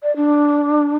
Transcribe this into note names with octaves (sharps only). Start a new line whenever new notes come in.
D5
D4